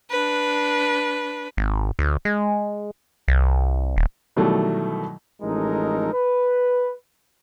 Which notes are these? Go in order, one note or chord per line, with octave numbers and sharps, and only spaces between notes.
D4 B4
G#1
D2
G#3
C2
D#1
B2 D#3 E3 F#3 G3 A3
A1 F2 G#3 D#4 A4 A#4
B4